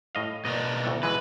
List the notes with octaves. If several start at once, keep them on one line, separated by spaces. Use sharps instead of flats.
A2 D#5 F5
B2 A#3 D4 D#5
D2 A2 A4
E3 F#3 G#3 B4